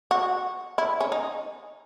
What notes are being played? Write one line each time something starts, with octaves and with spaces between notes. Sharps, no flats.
F#4
E4
C#4
D#4